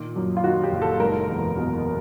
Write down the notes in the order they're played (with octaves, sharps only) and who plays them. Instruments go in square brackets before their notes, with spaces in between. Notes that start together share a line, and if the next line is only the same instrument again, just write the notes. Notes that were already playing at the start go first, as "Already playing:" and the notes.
Already playing: [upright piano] A#2 D#3
F#2
F4
D#3 F#4
G4
F#1
A4
G#3 A#4
E2
B2